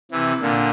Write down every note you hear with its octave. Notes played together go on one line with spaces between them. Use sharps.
C3 E3
A#2 D3